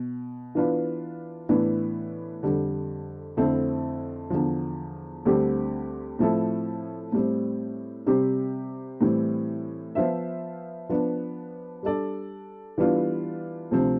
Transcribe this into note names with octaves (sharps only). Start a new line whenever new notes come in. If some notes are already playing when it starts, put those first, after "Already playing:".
Already playing: B2
E3 B3 D4 F4 B4
A2 E3 B3 D4
F2 D3 G3
F2 D3 A3 C4 E4
E2 D3 F3
D2 D3 G3 C4 G4
A2 F3 C4 E4 A4
A2 G3 C4
C3 G3 C4 G4 C5
A2 E3 G3 C4
F3 B3 F4 C5 E5
F3 B3 D4
G3 D4 A4 D5
E3 G3 B3 D4 F4
D2 C3 F3 C4